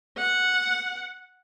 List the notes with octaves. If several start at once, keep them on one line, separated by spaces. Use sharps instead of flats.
F#5